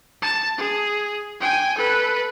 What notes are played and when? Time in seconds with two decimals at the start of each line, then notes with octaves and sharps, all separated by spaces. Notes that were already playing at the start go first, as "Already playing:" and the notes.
0.22 A5
0.58 G#4
1.40 G5 G#5
1.77 A4 B4